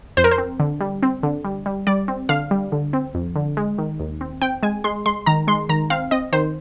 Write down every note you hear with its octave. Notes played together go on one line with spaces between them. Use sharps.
F2 C5
A#4
C5
C4
D3
G3
C4
D3
G3
G3
G3 D5
C4
D3 F5
G3
D3
C4
F2
D3
G#3
D#3
D#2
C4
C4 G5
G#3 G#5
G#3 C6
G#3 C6
D#3 A#5
G#3 C6
D#3 A#5
C4 F5
C4 D#5
D#3 C5